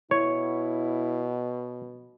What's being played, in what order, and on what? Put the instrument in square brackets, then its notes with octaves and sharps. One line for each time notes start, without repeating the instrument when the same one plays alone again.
[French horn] B2 [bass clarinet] E4 [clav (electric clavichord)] C#5